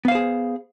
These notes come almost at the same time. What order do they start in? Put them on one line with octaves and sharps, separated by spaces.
B3 F5 C5 G#4